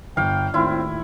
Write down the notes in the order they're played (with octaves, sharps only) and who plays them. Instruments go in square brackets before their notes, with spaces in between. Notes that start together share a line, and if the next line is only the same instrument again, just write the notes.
[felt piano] G1 [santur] F5 [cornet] G5
[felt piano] D#2 A2 [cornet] C4 [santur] E4 F4